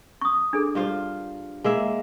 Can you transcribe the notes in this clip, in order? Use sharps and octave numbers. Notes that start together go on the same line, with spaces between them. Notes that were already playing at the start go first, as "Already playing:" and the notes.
C#6 D#6
D4 G#4 A4
G2 F4 C5
G#3 A#3 E5